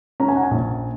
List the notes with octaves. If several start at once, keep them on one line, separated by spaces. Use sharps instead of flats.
C#4 A#5
G#5
F#5
G#5
A#1